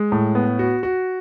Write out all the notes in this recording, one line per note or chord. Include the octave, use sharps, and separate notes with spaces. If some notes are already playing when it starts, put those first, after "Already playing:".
Already playing: G#3
A2
B3
F#4
F#4